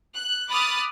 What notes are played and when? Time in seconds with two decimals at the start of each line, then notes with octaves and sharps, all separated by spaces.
0.15 F#6
0.50 B5 D6 D#6 F6 F#6 A6